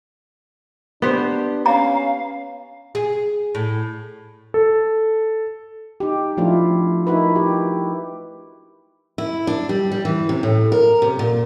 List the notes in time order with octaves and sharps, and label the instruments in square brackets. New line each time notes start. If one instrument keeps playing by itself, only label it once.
[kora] B3 G4 C5 [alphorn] D4
[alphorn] C#4 [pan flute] F5 [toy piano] A#5
[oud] G#4
A2
[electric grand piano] A4
[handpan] D#4 G4
F3 A3 D4 E4 F4
D#4 E4 F#4 A#4 B4
G4
[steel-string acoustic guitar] E4
D4
G3
G3
E3
C3
A2
A#4
C3
A#2